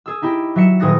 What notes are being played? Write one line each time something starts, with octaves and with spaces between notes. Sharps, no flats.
G#4 E6
D#4 E4 G4
F#3 E5 C#7 E7
D#1 G#4 D#6 F#6 A#6